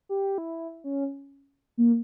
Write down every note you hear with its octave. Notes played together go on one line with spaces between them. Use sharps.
G4
E4
C#4
A#3